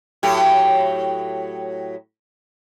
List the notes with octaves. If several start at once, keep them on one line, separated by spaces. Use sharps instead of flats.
A2 F#3 G4